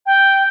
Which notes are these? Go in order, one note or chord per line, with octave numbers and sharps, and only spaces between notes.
G5